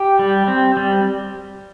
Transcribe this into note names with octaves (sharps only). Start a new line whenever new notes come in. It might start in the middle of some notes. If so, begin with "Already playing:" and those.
Already playing: G4 G5
G3
C4
G3